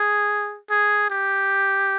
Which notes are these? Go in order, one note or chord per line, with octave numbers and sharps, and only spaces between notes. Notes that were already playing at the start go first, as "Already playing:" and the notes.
Already playing: G#4
G#4
G4